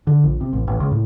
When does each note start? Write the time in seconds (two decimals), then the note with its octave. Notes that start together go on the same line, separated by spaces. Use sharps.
0.07 D3
0.24 A#1
0.41 C3
0.53 A1
0.67 A1
0.80 C#2
0.91 A2